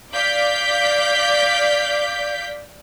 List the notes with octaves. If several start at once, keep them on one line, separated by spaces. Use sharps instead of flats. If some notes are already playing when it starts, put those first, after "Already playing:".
D5 F5 D6 G6 B6